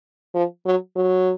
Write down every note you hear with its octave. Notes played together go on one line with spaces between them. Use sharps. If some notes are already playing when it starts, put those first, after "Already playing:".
F3
F#3
F#3